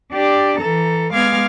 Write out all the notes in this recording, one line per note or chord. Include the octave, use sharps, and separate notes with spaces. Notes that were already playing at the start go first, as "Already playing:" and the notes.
D4 G4 D5
E3 A4 A#5
G#3 B3 F5 D6 F6 G#6